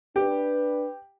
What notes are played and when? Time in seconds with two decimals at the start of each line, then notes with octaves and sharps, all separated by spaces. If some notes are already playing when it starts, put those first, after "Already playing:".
0.16 D4 G4 B4